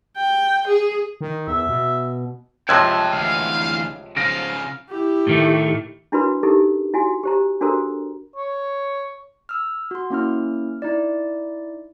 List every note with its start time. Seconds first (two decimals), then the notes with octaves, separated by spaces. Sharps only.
0.16 G5
0.67 G#4
1.21 D#3
1.48 E2 E5
1.69 B2
2.69 C#2 C3 F3 G5 A5 E6 F#6 G#6
3.12 D2 E3 F5
4.17 C#3 F3 F5 A#6 D7
4.89 E4 G4
5.27 A2 D#3 A3
6.12 D4 E4 F#4 A#4 B4 B5
6.43 D#4 E4 G4 A4 A#4
6.94 E4 F#4 G#5
7.23 G4 C5 A#5
7.61 D4 F#4 A4 A#4 C5 A#5
8.36 C#5
9.49 E6 F6
9.91 F#4 C6
10.10 A#3 C#4 E4 F6
10.82 D#4 E4 D5